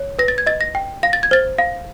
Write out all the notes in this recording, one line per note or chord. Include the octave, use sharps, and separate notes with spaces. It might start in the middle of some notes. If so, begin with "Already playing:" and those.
Already playing: C#5
B4 A#6
A6
G#6
D#5 A6
A#6
G5
F5 A#6
A6
G#6
C5 A6
F5